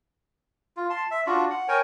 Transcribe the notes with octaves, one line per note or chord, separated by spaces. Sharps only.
F4
A5 C6
E5
D4 F4 F#4
F#5
A#4 C#5 G5 G#5